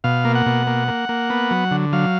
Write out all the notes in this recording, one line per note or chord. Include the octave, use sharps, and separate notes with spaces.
B2 F5
A#3
F#5
B2
A#3
A#3
A#3
B3
F#3
D3
F#3 F5